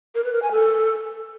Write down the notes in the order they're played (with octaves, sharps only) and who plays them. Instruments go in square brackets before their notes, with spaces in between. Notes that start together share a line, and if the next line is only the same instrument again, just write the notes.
[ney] A#4
B4
A#4
G#5
A4